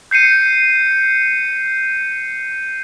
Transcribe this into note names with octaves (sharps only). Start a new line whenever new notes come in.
G6 C7 C#7 D#7